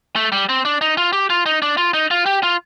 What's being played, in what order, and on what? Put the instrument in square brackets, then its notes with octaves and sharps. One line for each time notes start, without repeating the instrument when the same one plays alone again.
[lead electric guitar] A3
G3
C4
D4
D#4
F4
G4
F4
D#4
D4
F4
D#4
F4
G4
F4